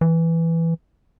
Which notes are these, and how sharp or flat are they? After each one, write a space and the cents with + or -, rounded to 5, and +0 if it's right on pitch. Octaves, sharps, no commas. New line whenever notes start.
E3 +5